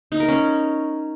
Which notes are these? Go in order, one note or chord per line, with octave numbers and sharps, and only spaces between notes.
D#4
A#4
C#4